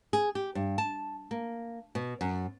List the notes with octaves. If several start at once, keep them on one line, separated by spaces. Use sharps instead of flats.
G#4
G4
G2
A5
A#3
B2
F#2